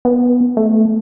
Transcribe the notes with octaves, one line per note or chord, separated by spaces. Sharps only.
B3
A3